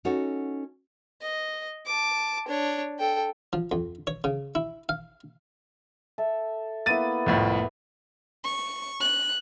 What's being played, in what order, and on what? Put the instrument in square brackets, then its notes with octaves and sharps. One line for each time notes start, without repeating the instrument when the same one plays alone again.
[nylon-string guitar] C#4 D#4 F#4 A4 C#5
[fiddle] D#5
A5 D6
D4 C#5
A4 G5
[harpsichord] F3
F2
C#5
C#3
E4
F5
[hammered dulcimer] A4 E5
[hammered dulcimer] A#3 B3 E4 [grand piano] A6 D#7
[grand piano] C2 F2 A2
[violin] C#6
F#6